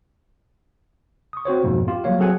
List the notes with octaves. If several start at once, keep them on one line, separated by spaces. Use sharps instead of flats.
C#6 D#6
C4 F#4 C5 C#5
F2 G#2 B2 F3 A#3
F4 G4
F#3 G3 A#3 C#5 F5
F#3 C4 G#4 A4 F#5 G#5